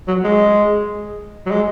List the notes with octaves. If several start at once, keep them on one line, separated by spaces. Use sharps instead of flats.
F#3
G#3
F#3
G#3